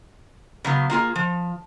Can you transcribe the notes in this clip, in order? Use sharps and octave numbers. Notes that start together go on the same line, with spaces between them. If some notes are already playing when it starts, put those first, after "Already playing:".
C#3 F#3 B3
A#3 F4 F#4 G#4
F3